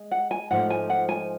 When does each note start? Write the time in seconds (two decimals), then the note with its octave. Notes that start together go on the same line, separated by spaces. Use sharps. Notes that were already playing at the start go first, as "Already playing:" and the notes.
Already playing: G#3
0.11 F#5
0.31 G#5
0.50 G#2 F3 A3 F#5
0.70 G#5
0.90 F#5
1.09 G#5